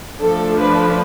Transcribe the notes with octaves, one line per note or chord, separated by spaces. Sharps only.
F3 A3 D4 A4
B4